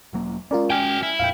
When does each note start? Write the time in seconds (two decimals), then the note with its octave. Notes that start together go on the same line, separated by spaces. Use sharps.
0.13 E1 F#3 A#3
0.51 G#3 C#4 F4 A#4 D5
0.70 F#4 G5 G#5 F6
1.03 E4
1.19 F2 A#2 F5 G5